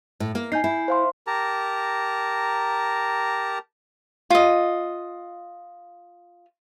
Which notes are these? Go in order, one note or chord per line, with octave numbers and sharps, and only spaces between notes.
A2
A#3
D#4 G#5 G6 C7
E4
C5 F5 C6
G4 A#4 A5 A#5
F4 D#5